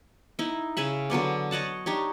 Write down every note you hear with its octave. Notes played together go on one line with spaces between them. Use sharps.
D#4 E4
C#3 G#4 E5 B5
D3 F#3 B3 D5
C#5 D#5 F#5 A5
D4 D#4 G4 C#5